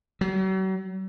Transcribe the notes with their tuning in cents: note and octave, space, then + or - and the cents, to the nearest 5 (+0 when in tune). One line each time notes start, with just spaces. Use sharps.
F#3 +45